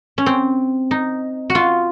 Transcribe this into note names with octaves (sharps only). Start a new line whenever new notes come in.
C#4
C4
D#4
F#4
F4